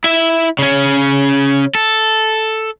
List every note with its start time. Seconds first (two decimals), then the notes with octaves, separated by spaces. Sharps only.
0.04 E4 E5
0.59 C#3 C#4
1.75 A4